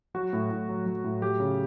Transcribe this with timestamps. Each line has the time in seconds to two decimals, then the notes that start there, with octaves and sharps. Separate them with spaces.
0.14 F#3 F#4
0.33 A2
0.50 A2
0.69 F#3
0.86 F#3
1.04 A2
1.22 F#3 G4
1.40 C#3